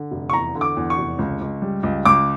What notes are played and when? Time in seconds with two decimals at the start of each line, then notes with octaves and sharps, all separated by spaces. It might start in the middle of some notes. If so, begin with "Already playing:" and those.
Already playing: D3
0.11 F1
0.30 C#6
0.33 E2 A#5
0.55 D3
0.61 D6
0.77 E2
0.90 C#6
0.97 F1
1.18 C#2
1.41 C#2
1.62 G3
1.83 C#2
2.05 C#2 D6